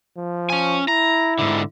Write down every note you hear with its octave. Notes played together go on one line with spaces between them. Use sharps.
F3
C#4 G#5
E4 A#5
G#2 D3